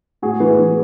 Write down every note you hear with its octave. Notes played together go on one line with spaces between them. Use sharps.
A2 F#4 G#4
E3
E3